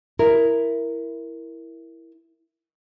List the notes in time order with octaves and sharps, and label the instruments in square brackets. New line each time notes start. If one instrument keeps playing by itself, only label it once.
[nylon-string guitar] E4 A#4